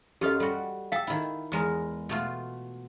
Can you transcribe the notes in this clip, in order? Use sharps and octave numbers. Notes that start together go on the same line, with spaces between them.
F#2 F4 G4 A4 D#5 F5
G3 F#4 A4
A4 F5 G5 A5 E6
D#3 E4 D#5 F5
E2 G#3 A#4
B2 A3 F4